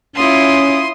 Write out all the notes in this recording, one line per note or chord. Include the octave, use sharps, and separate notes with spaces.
C#4 E4 F4 C6 D#6